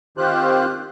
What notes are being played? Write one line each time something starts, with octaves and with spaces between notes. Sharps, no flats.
D#3 C4 F4 G4 C5 F#6